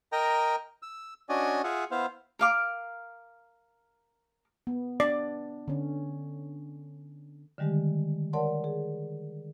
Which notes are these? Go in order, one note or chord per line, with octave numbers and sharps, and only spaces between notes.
A#4 D#5 G5 A#5
E6
C#4 D4 F#4 D5 D#5 G#5
F4 G#4 E5 F#5
B3 E4 C5 F5
A#4 F5 D6
B3
D4 D5
D3 C#4
D3 D#3 G3 G#3 G4
A#4 C#5 D5 F#5 A5 C6
G#4